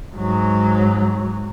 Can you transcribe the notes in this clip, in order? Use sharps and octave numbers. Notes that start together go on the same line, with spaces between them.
G#2 F#3